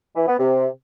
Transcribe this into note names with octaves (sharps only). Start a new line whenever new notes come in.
E3
B3
C3